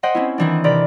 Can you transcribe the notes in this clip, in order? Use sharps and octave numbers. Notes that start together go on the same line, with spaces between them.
C5 D#5 F#5 G5
C4 C#4 E4
D#3 E3 D4
C3 A#4 D5 B5